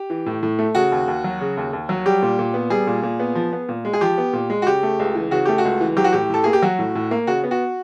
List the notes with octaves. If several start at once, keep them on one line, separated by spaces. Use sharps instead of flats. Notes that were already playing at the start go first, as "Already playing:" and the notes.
Already playing: G4
E3
A2
A2
A3
C#3 F#4
D#2
D#2
F#3
C#3
D#2
D#2
F#3
G3 G4
A#2
A#2
B3
G3 G#4
A#2
A#2
B3
F3
B3
A#2
G#3
G#4
F3 G4
B3
A#2
G#3
F#4
C#3 G4
A3
C#2
E3
C#3 F#4
A3 G4
F#4
C#2
E3
F#3 G4
F#4
A2 G4
A2 A4
A#3 G#4
G4
F#3 F#4
A2
A2
A#3
C#3 F#4
B3
F#4